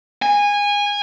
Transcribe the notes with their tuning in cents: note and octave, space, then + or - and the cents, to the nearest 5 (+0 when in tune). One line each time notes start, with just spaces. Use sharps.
G#5 -20